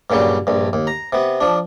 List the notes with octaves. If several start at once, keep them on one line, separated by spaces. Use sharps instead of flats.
G2 A#2 C#3 F#3 G3
A#1 G2
D#2
A#5
C3 B3
F3 D4